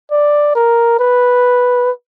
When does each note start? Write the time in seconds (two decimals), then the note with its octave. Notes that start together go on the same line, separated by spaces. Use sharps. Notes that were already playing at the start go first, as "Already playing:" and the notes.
0.11 D5
0.55 A#4
0.99 B4